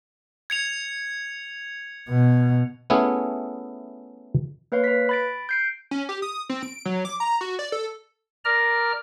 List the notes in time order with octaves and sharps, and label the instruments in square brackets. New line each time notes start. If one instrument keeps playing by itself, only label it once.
[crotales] G#6 C#7 F7
[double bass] B2
[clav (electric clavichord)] A3 B3 C#4 E4 G#4
[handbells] A#3 B4 C#5 F5
B4 B6
B5 A6 D7
G6 C7 D7
[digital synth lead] C#4
G4
D#6
C4
D7
F#3
D6
A#5
F#4
D5
A4
[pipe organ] A#4 D5 A#5 F6